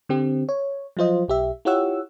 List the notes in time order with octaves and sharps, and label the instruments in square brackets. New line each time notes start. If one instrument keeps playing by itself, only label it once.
[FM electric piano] D3 C4 G4
C#5
F3 F#3 F4 C5 D#5
B1 G4 E5
E4 F4 G4 C#5 F#5 E6